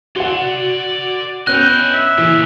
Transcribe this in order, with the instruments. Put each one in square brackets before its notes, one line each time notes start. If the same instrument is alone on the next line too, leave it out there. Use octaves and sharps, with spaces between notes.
[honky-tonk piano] F#4 F#5 [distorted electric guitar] D5 C6
[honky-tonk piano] B3 C#4 [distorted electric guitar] E4 D#5 [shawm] G5 [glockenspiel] F#6
[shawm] E5
[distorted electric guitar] A#2 C#3 [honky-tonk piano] E3